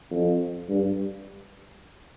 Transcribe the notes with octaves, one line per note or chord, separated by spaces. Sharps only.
F2
G2